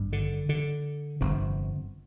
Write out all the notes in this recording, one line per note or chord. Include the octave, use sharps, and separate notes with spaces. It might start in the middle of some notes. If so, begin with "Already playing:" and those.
Already playing: G#1 G2
D3
D3
G1 F2 C3